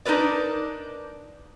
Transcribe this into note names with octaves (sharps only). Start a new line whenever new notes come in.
D4 D#4 F4 A#4 B4 D5